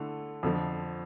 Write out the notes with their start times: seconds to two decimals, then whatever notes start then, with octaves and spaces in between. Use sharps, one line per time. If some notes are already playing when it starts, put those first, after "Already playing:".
Already playing: D3 A3 E4 A4
0.43 F2 D3 F3